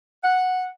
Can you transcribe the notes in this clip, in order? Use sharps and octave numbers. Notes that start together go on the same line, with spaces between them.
F#5